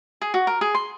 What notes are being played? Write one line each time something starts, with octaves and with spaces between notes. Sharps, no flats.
G#4
F#4
A#4
G#4
C6